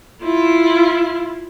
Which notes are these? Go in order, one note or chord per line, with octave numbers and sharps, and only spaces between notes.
E4 F4